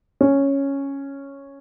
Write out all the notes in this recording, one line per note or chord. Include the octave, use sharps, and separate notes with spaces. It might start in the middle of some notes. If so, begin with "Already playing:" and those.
C#4